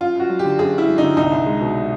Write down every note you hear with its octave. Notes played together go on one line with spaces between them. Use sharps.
F#2 F4
F#2 F#4
F#3
G4
D3
F#2 G#4
F#2 E4
F#3
D3 D#4
C2 D#4
C2
G#3
B2